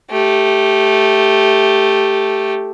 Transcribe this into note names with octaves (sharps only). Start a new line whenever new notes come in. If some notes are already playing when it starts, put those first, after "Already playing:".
A3 G4